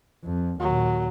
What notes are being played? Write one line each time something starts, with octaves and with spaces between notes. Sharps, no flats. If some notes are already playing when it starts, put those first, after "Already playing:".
F2
D#2 A#2 F#3